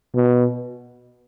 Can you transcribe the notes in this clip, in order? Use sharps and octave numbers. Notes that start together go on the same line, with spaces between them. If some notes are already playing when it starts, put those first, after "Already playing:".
B2